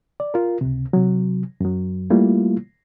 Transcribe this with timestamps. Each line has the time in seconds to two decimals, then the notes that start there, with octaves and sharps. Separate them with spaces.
0.20 D5
0.34 F4 A#4
0.61 C#2 C3
0.93 C3 F#3
1.61 F#2 F#3
2.10 G3 A3 A#3 E4 F4